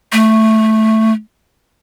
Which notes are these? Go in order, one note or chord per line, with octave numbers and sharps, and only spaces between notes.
A3